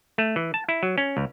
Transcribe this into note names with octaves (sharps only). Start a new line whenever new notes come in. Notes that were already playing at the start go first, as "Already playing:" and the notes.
A3
E3
A5
E4
F#3
C#4
C#2